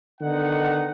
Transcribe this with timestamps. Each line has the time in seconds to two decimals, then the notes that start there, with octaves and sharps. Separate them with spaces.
0.21 D3 D#3 B3 D#4 F#5